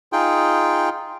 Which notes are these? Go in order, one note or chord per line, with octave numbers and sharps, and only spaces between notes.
D#4 F4 G#4 G5